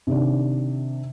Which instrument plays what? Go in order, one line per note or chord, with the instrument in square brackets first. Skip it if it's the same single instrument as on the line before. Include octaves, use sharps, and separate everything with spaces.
[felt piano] C3 D#3 D4